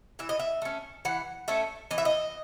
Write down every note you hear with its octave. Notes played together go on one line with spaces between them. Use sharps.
E3 E5
D#5
E5
A3 C#4
E3 F#5
A3 C#4 E5
E3 D#5
E5
D#5